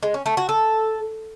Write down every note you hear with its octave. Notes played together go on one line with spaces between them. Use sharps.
G#3
C#4
A3
F#4
A4